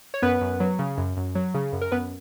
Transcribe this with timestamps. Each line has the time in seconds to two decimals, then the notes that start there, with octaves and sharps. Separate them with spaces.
0.14 C#5
0.22 F#2 B3 B4
0.41 F#2
0.60 F#3
0.79 C#3
0.98 F#2
1.17 F#2
1.35 F#3
1.54 C#3
1.73 F#2
1.81 A#4
1.92 F#2 B3 B4